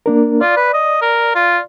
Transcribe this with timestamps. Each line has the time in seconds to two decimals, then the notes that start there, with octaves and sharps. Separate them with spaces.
0.06 A#3 D4 A#4
0.41 F4 D5
0.57 B4
0.73 D#5
1.02 A#4
1.35 F4